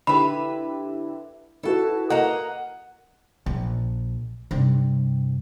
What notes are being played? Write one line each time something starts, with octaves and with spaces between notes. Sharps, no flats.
D3 E4 G4 B4 E5 B5
E4 F#4 A4 B4 A5
A#3 D#5 F#5 A#5
A#1
G2 C3